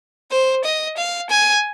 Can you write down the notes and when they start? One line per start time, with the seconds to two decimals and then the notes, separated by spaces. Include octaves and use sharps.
0.31 C5
0.64 D#5
0.97 F5
1.30 G#5